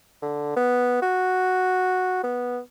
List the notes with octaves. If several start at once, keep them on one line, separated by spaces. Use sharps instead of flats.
D3
B3
F#4
B3